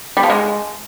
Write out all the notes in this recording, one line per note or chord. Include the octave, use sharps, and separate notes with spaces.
G3
F3
G#3